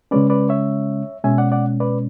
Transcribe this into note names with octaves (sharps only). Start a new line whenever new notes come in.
C#3 G#3 C#4 B4 D5
B4 D5
C#5 E5
B2 G#3 C#4 E5 G#5
D5 F#5
D5 F#5
B4 D5